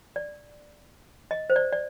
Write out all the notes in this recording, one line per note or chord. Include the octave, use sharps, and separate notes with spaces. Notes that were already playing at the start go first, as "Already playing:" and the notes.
D5
D#5
C5
D5
D5